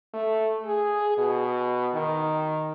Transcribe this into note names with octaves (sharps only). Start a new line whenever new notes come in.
A3
G#4
B2
D#3